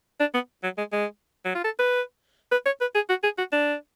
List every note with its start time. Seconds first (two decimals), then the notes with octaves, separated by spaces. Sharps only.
0.20 D4
0.34 B3
0.63 F#3
0.78 G#3
0.92 G#3
1.45 F#3
1.55 F4
1.64 A4
1.79 B4
2.52 B4
2.66 C#5
2.81 B4
2.95 G#4
3.09 F#4
3.23 G#4
3.38 F#4
3.53 D4